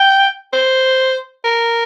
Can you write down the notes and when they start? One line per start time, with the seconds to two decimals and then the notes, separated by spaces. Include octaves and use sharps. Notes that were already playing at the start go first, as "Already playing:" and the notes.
Already playing: G5
0.53 C5
1.44 A#4